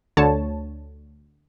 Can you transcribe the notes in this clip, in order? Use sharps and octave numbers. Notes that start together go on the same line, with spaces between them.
D2 D3 C#5 A5